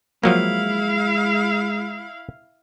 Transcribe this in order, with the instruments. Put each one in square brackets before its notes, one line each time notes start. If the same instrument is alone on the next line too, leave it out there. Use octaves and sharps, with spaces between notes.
[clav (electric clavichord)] F3 F#3 A#3 [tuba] G#3 [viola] E4 F5